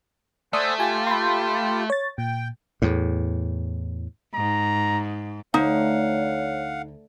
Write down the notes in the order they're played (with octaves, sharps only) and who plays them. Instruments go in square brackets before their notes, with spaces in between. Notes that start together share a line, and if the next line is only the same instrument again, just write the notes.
[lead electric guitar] A3 [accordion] C5 F#5 G#5 [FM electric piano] D5 D#6 E6
[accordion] F4 G4 [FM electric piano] G#5
[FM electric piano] B5 C6
C#5 A6
[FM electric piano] A#2 [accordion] G5
[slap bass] E2 A2
[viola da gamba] G#2 [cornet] A#5
[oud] D2 [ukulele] D#4 [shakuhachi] C#5 [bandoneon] F5 F#5